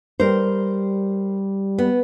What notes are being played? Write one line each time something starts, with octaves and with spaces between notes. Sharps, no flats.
G3 A#4 C5
B3